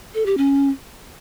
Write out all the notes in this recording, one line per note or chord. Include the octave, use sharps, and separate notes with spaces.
A4
G4
C#4